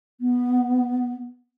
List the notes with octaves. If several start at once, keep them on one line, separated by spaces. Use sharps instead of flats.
B3